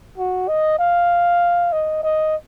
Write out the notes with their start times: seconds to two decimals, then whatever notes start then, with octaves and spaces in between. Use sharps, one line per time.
0.18 F#4
0.48 D#5
0.79 F5
1.72 D#5
2.03 D#5